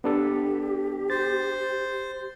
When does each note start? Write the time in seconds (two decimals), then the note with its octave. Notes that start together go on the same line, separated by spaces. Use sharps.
0.04 B3 D4 G4 A4
1.10 C5 A6